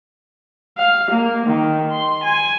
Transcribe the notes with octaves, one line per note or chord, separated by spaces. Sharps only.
F5
A#3
D#3
C6
G#5